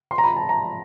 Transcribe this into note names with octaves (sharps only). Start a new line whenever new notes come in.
C6
A#5
B5
A5
A#5